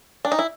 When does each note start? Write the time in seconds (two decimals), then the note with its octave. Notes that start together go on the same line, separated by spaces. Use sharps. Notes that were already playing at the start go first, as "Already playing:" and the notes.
0.25 D4
0.32 D#4
0.39 E4